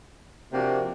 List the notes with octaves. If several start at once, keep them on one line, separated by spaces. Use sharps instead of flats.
C3 F3 A#3 D4 F#4